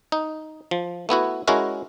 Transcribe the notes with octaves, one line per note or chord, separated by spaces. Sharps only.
D#4
F3
A3 B3 E4 F#4
G#3 C#4 E4 F#4 A#4